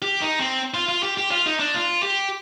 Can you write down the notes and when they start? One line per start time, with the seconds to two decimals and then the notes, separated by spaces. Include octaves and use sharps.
0.02 G4
0.22 D#4
0.40 C4
0.74 F4
0.89 F4
1.03 G4
1.17 G4
1.31 F4
1.46 D#4
1.60 D4
1.74 F4
2.03 G4